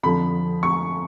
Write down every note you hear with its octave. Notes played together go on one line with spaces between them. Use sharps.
F2 D3 F3 B5
C#6